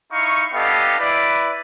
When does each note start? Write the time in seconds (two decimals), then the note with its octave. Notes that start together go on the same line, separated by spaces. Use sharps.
0.13 D#4 E4 F5 C#6
0.54 B3 D4 G4 A4 D#5 F5
0.99 E4 B4 D5